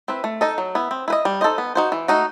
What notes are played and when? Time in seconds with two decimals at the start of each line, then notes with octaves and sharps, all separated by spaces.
0.08 C4 E4 B4
0.24 A3
0.41 D#4 A4 D#5
0.58 F#3
0.75 B3 E4
0.91 C4
1.08 E4 B4 D#5
1.25 G3
1.41 D#4 A4 C5 D#5
1.58 B3
1.75 D#4 F#4 C5
1.92 E3
2.08 A3 D#4 F#4